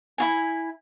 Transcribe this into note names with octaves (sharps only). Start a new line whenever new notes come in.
E4 F4 G#5